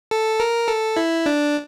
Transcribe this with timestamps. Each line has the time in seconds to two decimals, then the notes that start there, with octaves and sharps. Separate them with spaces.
0.11 A4
0.40 A#4
0.68 A4
0.97 E4
1.26 D4